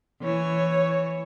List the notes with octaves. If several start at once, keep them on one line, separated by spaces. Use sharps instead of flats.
E3 C#5